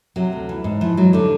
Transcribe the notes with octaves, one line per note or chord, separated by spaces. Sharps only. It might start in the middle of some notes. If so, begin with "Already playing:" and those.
C3 F#3
D2
E3
G#2
E3 F3
G#2 F#3
D3 G3